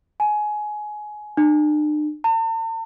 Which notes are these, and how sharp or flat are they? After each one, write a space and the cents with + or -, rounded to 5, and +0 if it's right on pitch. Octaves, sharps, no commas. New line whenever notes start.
G#5 +20
D4 +45
A5 +45